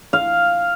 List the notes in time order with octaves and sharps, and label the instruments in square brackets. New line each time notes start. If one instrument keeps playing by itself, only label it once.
[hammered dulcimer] F5